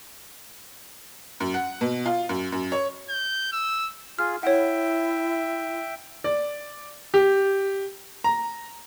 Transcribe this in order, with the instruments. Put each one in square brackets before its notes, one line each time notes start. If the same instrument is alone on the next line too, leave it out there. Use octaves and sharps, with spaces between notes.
[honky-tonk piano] F#2
F#5
B2
F4
F#2
F#2
C#5
[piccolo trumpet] G6
E6
[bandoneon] F4 G#4 [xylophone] F6
[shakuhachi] E4 [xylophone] C#5 F#5 [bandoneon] E5 G5
[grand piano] D5
G4
A#5